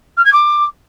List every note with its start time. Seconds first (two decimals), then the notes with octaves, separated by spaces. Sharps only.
0.17 F6
0.25 G#6
0.33 D6